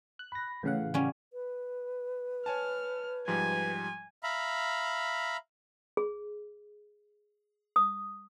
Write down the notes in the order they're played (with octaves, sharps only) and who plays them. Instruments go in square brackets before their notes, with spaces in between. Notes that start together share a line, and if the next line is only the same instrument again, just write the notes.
[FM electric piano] F#6
[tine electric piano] B5 A#6
[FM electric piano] A2 C#3 F#5 [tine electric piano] E3 F5
[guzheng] G3 C#4
[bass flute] B4
[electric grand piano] C#5 G#5 A5 [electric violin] F6
[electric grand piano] G#2 F3 G3 [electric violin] G#5
[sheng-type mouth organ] E5 F5 A#5 B5
[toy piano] G#4
D#6